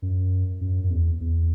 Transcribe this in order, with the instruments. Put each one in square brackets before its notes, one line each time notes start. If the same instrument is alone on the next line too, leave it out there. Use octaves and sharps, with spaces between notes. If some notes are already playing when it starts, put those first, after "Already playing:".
[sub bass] F#2
F#2
F#2
E2
E2